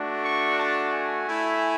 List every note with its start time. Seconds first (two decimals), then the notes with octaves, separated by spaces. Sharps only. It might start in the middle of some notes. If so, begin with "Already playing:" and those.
Already playing: A3 D4 F#4
0.22 C#6
0.58 A5
0.92 G#5
1.27 A3 E4